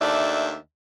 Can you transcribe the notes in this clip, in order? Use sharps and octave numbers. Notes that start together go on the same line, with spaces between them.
D#2 A3 D4 D5 E5